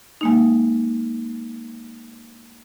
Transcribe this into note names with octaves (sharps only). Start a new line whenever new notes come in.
G#3 A#3 D#4